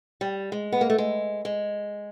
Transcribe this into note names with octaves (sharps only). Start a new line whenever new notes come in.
G3
G#3
B3
A#3
A3
G#3
G#3